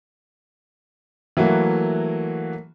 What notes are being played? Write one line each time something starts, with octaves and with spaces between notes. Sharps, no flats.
E3 F#3 A3 A#3 F#4